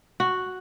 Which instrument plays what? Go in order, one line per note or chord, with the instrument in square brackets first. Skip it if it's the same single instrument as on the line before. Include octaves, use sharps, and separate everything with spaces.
[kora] F#4